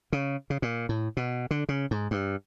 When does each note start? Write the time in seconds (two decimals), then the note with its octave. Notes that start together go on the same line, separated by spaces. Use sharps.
0.12 C#3
0.50 C#3
0.62 A#2
0.89 A2
1.17 B2
1.51 D3
1.69 C#3
1.91 G#2
2.11 G2